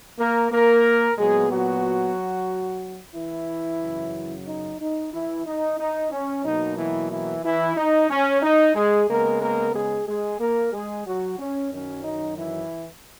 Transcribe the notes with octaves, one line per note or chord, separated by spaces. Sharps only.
A#3 A#4
A#3 A#4
A#2 F#3 G#3 B3 G#4
F#3 F#4
E3 E4
F#2 C#3 F#3
D#4
D#4
E3 E4
D#4
D#4
C#4
B2 F#3 A#3 D#4
E3 E4
E3 E4
E3 E4
D#4
C#4
D#4
G#3 G#4
C#3 G#3 A#3 B3 A#4
A#3 A#4
G#3 G#4
G#3 G#4
A#3 A#4
G#3 G#4
F#3 F#4
C#4
F#2 D#3 F#3 C#4
D#4
E3 E4